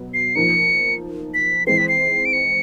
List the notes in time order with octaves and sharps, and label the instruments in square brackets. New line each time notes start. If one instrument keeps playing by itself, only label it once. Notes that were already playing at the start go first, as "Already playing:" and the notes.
Already playing: [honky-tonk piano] B2 F#3 B3
[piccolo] C7
[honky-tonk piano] F3 A#3 D#4 [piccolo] C#7
[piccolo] B6
[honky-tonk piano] E3 G#3 C4 [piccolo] C7
[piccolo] B6
C7
D7
C#7